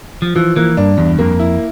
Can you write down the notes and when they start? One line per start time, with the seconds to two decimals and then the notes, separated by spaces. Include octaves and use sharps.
0.22 F3
0.36 E3 F3
0.56 E3 A#3
0.77 G2 D4
0.98 E2 G2
1.19 F2 A#3
1.40 E4